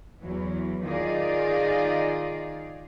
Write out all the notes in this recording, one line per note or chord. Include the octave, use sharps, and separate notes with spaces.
E2 E3 F#3
D#3 D#4 F4 G#4 D5 D#5